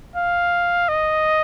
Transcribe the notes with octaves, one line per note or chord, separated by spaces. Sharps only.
F5
D#5